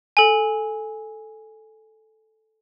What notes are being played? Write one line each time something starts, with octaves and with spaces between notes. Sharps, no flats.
A4 G#5